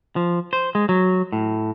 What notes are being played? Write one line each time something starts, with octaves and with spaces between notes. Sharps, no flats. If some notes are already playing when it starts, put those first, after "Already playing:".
F3
C5
G#3
F#3
A2